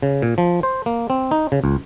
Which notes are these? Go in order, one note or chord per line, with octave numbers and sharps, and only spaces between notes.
C#3
A#2
F3
C5
A#3
C4
D#4
C#3
C#2